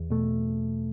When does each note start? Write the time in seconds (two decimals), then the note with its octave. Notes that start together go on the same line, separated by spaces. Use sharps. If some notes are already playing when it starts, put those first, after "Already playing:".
Already playing: E2
0.10 B2 A3